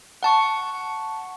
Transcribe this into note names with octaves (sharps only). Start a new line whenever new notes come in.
F#5 A5 C#6